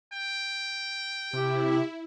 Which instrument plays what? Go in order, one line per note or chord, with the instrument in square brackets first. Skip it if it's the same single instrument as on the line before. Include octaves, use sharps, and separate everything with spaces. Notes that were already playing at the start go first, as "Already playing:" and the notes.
[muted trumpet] G5
[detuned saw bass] C3 [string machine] E4 [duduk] G4